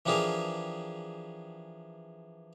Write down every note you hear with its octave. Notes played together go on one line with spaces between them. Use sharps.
E3 F3 D4 G4 G#4 A#4